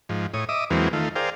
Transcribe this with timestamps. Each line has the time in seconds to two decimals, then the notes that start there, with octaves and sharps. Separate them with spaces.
0.09 G#2 F3
0.34 A2 C#5 D#6
0.49 D#5 E5 D6 D#6
0.70 E2 E3 F#3 G#3 A#3 C4
0.93 D#3 A3 F4
1.16 G#4 A#4 C5 D5 F5 G5